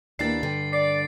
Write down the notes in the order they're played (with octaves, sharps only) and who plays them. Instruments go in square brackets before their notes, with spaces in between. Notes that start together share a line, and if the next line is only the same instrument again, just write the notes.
[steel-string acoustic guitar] D#2 D4 G4 [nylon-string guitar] A#3 B3 E4 [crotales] A6 C7
[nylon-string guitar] G2 G5 [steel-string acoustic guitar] D3
[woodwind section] D5 [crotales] C7